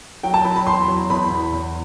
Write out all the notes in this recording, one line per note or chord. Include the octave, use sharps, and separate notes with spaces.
F#3 G5
A5
F#3 B5
B5
E2 C6
F#3
E2 B5
E2
E2